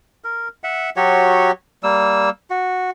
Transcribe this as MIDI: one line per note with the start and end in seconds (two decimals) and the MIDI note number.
0.24 0.48 70
0.64 0.90 76
0.64 0.90 78
0.96 1.51 54
0.96 1.51 66
0.96 1.51 67
0.96 1.51 73
1.83 2.30 55
1.83 2.30 58
1.83 2.30 88
2.50 2.90 66